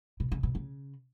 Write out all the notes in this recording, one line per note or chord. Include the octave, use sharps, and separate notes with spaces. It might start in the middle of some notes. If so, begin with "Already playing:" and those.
B2
C#3
B2
C#3